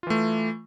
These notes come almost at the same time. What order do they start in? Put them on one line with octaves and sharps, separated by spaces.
F4 E3 A3